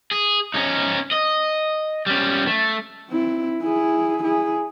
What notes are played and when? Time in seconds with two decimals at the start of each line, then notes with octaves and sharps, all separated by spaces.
0.11 G#4
0.54 C#4 D#4
1.12 D#5
2.06 G3 C#4
2.47 A3
3.09 C4 E4
3.61 E4 G#4
4.23 E4 G#4